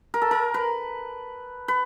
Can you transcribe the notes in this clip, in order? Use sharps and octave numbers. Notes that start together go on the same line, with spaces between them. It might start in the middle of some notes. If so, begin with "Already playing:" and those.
A#4
A4
A#4
B4
B4